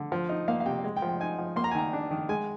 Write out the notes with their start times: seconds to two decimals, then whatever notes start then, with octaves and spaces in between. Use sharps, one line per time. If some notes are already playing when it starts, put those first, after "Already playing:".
Already playing: D3
0.12 F3
0.29 D#4
0.48 A#3 F5
0.60 F5
0.66 C3 G5
0.84 G#3
0.96 G5
1.02 F3
1.09 G5
1.20 D#4 G#5
1.38 F3
1.56 A#3 C6
1.64 A#5
1.71 G#5
1.75 D#3 A#5
1.93 D4
2.11 D#3
2.29 G#3 G#5